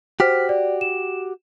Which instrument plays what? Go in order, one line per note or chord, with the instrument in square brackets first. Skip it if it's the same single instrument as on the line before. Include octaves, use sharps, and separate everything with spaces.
[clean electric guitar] F#4 G4 [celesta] C5 F6 B6
[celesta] D5
E7